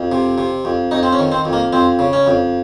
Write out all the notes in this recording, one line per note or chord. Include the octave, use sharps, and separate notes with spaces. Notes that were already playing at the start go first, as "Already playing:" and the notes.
Already playing: F2
C3
C3
F2
F2 D#4
C4
C#4
D#3
C4
F2
A#3
F2 C4
C#3
C#4
F2